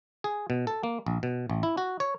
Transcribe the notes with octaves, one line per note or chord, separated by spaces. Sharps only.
G#4
B2
A4
A#3
A#1
B2
A1
E4
F#4
C#5